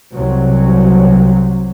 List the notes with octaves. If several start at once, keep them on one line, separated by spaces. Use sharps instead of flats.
C2 C3 F#3